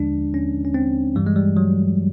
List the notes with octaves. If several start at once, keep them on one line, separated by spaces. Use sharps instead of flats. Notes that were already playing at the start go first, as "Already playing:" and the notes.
Already playing: D#2 D3 F3 G#3 D4
C#4
C#4
C4
G2 E3 G3
G#3
G3
F#3